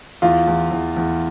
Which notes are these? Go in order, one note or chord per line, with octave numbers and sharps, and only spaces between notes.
E2 F4
E2
E2
E2